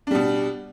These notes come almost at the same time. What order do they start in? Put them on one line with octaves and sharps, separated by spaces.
D4 G3 B2